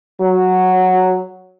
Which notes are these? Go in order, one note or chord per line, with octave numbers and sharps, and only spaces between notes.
F#3